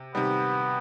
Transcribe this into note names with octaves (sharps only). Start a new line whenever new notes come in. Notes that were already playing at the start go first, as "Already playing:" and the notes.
Already playing: C3
C3 D#3 G3 B3